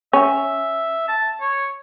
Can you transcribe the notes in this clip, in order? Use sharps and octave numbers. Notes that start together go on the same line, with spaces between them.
C#4 E5
A5
C#5